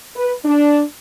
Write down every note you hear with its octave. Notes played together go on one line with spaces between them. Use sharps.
B4
D4